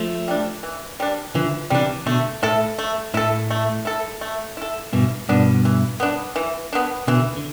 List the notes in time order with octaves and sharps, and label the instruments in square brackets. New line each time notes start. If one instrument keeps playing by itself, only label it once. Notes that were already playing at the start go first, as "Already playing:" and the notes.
Already playing: [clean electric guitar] F3 A3
[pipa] G3 D4
E3
G3 D4
[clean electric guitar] D3 F3 [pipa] E3
[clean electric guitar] C3 E3 [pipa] G3 D4
[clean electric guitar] B2 D3 [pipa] A3
[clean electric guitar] A2 [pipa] E4 A4
[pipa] A3
[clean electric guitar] A2 [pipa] E4 A4
[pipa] A3
E4 A4
A3
E4 A4
[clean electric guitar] G2 B2 [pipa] E3
[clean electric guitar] G2 B2 [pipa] B3 D4
[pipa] E3
B3 D4
E3
B3 D4
[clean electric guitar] B2 D3 [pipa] E3
[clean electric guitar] D3